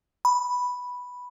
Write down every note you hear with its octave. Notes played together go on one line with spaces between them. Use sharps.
B5